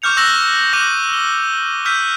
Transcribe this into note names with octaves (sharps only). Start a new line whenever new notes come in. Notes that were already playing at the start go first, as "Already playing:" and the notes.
C#6 D6 F6 G6 C#7 F7
C#6 E6 F#6 A#6 E7 F#7
D6 F#6 A#6 D#7 F#7
G7
E6 F6 G6 B6 D#7